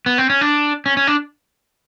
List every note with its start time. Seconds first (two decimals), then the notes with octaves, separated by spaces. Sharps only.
0.06 B3
0.18 C4
0.30 C#4
0.41 D4
0.86 C#4
0.97 C#4
1.07 D4